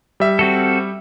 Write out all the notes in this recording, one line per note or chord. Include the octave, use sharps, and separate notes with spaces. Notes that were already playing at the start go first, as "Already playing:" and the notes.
G3 E5
C4 F#4 A4